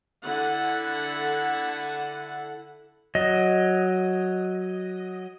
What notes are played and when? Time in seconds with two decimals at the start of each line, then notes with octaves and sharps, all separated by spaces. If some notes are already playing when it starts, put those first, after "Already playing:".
0.23 D3 E4 F#5
3.15 F#3 D#5